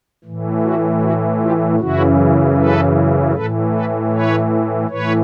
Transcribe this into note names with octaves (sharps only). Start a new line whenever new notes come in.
A2 E3
E4 F#4
E4 F#4
F4 G4
F#2 C#3 E3 E4 F#4
A4 B4
A2 E3 A4 B4
A4 B4
B4 C#5
A2 E3 B4 C#5